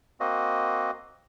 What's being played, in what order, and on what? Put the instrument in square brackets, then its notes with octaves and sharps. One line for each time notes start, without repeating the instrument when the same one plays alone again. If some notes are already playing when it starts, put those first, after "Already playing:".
[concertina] A#3 C4 F#4 D#5